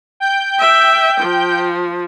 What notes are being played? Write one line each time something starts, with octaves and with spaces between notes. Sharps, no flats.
G5 G6
E5
F3